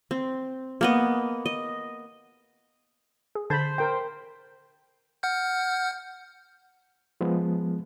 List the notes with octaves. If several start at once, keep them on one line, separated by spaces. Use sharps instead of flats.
C4
A#3 B3 D#5
D#5
G#4
D3 C5 A5 B5 G6
A#4 G5
F#5 F6 G6
F3 G#3 B3